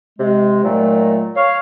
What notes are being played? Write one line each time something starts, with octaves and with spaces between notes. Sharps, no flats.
C3 G#3
A#2 D#3 F#3 A3
C#5 F5